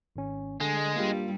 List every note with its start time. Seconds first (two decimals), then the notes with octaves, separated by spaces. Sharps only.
0.16 G#1 C#4
0.61 D3 G#3
0.96 G2 G3 A#3 F4